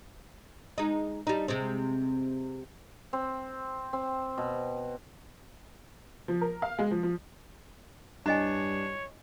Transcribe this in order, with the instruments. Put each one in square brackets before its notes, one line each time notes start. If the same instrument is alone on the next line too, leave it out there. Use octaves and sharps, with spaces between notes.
[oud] G#3 D#4
G3 D#4
C3 G#3 C4
[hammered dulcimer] C4
C4
B2
[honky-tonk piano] F3
A#4
F5
G#3
F3
F3
[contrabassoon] G2 [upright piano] D4 [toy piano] E4 D#5 G#5 [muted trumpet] C#5